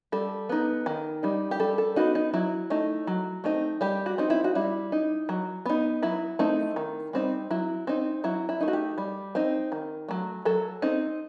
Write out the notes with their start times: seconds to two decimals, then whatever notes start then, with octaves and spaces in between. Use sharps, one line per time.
0.12 G3 A4
0.49 B3 D#4
0.86 D#3
1.23 G3 D#4
1.51 G4
1.60 G3 A4
1.78 A4
1.96 B3 D#4 F#4
2.15 D#4
2.34 F#3 E4
2.70 A3 D#4
3.07 F#3
3.44 A3 C4 D#4
3.81 G3 G4
4.06 F#4
4.18 C4 D#4
4.30 E4
4.44 F#4
4.55 G3 E4
4.92 D#4
5.29 F#3
5.66 B3 D#4
6.03 F#3 E4
6.39 A3 C4 D#4
6.76 D#3
7.13 G3 C4 D#4
7.51 F#3 E4
7.87 C4 D#4
8.24 F#3 E4
8.49 E4
8.60 A3 D#4
8.68 F#4
8.73 G4
8.98 G3
9.35 C4 D#4
9.72 D#3
10.09 F#3 A3
10.45 F#3 A4
10.82 C4 D#4